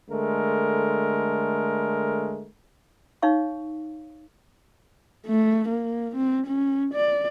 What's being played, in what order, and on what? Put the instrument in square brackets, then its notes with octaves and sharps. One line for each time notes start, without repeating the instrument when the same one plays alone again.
[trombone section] D3 G#3 A3 A#4
[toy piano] D#4 C#5 F5 C#6
[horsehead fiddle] A3
A#3
C4
C#4
D5